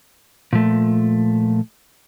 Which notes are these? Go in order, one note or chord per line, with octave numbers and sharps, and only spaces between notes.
A#2 F3 A3